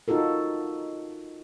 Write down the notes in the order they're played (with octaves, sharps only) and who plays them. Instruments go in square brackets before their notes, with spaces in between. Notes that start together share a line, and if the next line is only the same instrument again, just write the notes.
[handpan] D#4 F4 F#4 A4 A#4